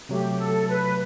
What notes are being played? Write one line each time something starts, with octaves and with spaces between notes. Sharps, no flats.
C3 F#3 A3 G4
A4
B4